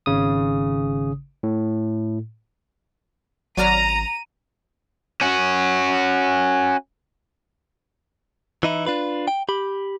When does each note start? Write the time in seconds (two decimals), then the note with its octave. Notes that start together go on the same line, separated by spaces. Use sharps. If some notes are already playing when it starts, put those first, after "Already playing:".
0.06 G#1 C#3 D#6
1.43 A2
3.57 G#1 F#3 D5 A#5 F6 D#7
5.21 C#4 F#4
8.63 E3 D#4 E4
8.86 D4 F4 B4
9.28 G5
9.49 G4 B5